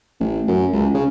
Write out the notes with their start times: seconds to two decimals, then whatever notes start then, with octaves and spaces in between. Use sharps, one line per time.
0.20 A1
0.48 F#2
0.73 C#2
0.94 C#3